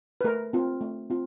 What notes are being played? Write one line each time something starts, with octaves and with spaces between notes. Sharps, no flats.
B4
A3 A#4
C4 F4
A3
C4 F4